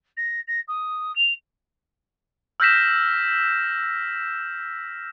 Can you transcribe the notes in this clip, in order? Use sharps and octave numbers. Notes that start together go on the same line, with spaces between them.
A#6
A#6
D#6
F7
E6 F6 G6 A#6 B6 E7